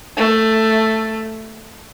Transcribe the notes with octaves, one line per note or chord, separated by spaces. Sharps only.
A3